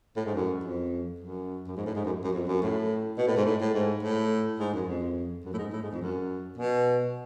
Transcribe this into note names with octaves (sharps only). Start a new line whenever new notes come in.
A2
G#2
F#2
F2
F#2
F#2
G#2
A2
G#2
F#2
F#2
F2
F#2
A2
B2
A2
G#2
A2
A2
G#2
A2
G#2
F#2
F2
F#2
A2
G#2
A2
G#2
F2
F#2
B2